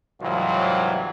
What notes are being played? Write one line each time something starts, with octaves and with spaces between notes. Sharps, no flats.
C2 G#2 E3 F#3 F4